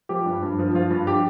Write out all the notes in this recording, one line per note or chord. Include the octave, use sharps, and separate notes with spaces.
F3 G4
G2
G2
F3
F3 F4
G2
G4